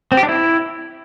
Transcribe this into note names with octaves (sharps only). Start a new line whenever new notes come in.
C4
G4
D4
E4